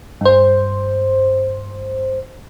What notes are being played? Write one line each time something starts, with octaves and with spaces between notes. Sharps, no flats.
G2 C5